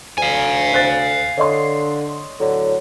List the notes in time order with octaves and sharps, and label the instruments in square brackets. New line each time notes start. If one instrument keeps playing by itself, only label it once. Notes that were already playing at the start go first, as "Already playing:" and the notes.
[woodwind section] D2 [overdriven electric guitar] F5 G#5
[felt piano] C5 F#6 A6
[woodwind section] D3 [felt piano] C#5 D#5 C6
[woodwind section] A2 D3 F#3